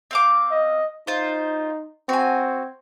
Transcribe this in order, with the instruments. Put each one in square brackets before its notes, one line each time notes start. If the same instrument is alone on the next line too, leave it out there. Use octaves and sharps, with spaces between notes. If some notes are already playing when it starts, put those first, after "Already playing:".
[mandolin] C4 F5 D6
[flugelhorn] D#5
[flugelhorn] D#4 [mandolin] F4 C5
[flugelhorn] C4 [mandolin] F#4 G#5